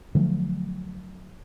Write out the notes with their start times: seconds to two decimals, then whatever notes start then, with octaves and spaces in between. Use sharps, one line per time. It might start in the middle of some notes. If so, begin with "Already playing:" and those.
0.15 D3 F3 F#3 A3